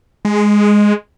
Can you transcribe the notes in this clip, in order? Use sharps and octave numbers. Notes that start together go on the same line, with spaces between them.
G#3